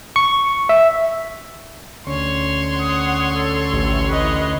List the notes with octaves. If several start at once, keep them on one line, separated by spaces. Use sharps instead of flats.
C#6
E5
D2 C#4 C#5 C6 C#6
F#5 D#6
A4
A1
B4 D#5